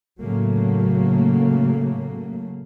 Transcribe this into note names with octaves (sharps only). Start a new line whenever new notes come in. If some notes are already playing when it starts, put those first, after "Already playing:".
A2 C#3 F#3 A3 A#3